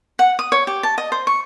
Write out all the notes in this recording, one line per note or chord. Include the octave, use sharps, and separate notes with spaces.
F#5
D#6
C#5
G4
A5
D#5
C5
C#6